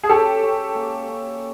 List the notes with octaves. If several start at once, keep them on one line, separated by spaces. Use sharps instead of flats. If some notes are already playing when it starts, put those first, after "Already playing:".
G#4
C#4 G4 A4
C#4
A#3
C#4